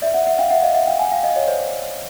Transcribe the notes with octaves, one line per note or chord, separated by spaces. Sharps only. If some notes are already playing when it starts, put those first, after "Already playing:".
D5 E5
E5 F#5
E5 F#5
F5 G5
E5 F#5
D#5 F5
E5 F#5
F5 G5
F#5 G#5
F5 G5
D#5 F5
C#5 D#5
C5 D5